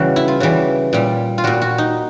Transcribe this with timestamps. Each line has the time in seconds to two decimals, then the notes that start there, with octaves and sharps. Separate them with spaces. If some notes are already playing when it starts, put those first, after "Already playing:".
Already playing: C#3 E3 G3 F#4
0.16 E4
0.28 F4
0.40 C#3 E3 G3 F#4
0.93 A#2 G3
1.38 F4
1.44 A#2 G3 F#4
1.62 F#4
1.78 D#4